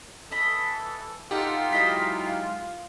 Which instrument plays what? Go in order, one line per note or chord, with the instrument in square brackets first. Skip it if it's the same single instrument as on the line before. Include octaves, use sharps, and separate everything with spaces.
[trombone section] E3 A4 [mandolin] D#5 B5
[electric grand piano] D#4 G4 [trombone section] F4 [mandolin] A4 F#5 F#6
[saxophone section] F#3 G#3 E4 [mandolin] C5 D#5 B5